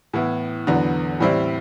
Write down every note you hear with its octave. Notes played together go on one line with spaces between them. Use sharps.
A2 E3 B3 E4
E2 D3 F#3 B3
A2 E3 G3 C4 E4